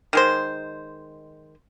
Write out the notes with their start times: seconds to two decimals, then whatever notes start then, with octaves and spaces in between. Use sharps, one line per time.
0.13 D#3 G#3 C5